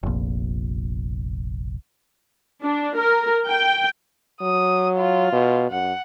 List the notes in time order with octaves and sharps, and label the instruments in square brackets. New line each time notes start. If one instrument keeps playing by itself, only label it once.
[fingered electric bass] F1 A#1
[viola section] D4
A#4
G5
[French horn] F#3 [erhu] D#6
[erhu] F4
[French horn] B2
[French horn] F#2 [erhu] F#5